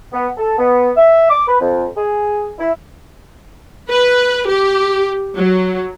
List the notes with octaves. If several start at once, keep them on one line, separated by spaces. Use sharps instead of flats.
B3
A4
B3
E5
D6
B4
F2
G#4
E4
B4
G4
F#3